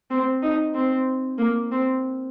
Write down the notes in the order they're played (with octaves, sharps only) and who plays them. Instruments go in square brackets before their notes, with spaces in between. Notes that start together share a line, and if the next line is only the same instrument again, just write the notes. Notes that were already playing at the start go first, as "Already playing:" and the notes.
[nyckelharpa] C4
D#4
C4
A#3
C4